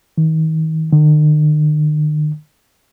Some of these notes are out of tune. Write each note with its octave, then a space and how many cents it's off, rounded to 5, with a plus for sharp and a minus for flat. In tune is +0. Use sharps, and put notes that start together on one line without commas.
D#3 +35
D#3 -45